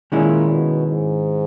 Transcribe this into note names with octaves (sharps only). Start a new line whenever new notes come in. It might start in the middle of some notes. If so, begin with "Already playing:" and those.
A#2 D#3 G#3 C#4 E4
B2
G#2